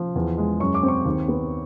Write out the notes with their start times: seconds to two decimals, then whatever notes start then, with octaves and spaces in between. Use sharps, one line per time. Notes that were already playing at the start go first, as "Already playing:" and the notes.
Already playing: F3
0.15 E2
0.38 G#3
0.60 F#2 C#6
0.74 D6
0.83 C4
0.88 C#6
1.05 D#2
1.28 B3